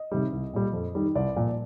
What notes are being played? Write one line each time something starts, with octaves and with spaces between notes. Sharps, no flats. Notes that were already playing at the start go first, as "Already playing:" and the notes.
Already playing: D#5
C3 D#3 G3
C2
A#2 G3
F2
D#3 G3
C2 D5
A#2 F3